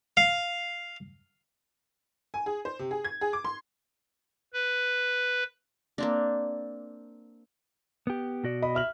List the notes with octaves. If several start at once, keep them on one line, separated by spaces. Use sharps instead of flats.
F5
G#5
G#4
C5
C3
G#4
G#6
G#4
D6
C6
B4
A#3 C4 D4
B3 G4
B2 F#4 D5
D#5 B5
E5 F6 F#7